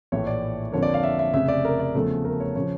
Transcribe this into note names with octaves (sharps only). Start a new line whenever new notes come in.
A#1 A2 E3 A3 C#5
D5
F2 D3 F3 A#3 C#5
D5
F5
E5
E5
F1 F2 C#3 E5
D5
A#4
D5
E2 C#3 F3 A3 A4
A#4
C#5
C#3 F3 C#5